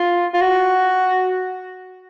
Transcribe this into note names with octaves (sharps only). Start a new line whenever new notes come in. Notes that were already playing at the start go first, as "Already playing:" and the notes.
Already playing: F4
F4
F#4